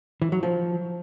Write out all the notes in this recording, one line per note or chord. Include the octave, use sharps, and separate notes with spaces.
E3
F#3
F3